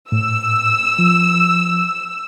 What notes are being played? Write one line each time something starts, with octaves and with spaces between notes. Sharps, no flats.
A2 E6
F3